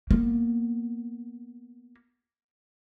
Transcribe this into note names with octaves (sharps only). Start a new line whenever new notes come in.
A#3 B3